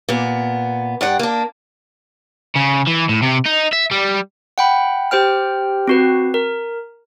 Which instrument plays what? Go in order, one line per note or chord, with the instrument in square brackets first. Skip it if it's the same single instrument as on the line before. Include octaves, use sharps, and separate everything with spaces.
[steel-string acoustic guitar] A#2 B3
G2 D5 F#5 G5
A#3 D4
[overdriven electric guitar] C#3
E3
A2
C3
D#4
E5
G3
[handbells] F#5 G5 B5
G4 C5 G5 F6
C4 F#4 B4
A#4